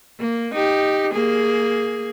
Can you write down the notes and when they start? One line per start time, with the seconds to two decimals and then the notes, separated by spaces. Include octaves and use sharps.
0.20 A#3
0.55 D#4 G4
1.13 A#3 G#4